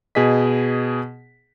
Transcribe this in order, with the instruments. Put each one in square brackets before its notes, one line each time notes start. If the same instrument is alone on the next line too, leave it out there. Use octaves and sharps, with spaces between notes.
[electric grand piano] B2 G#4 D#5 B6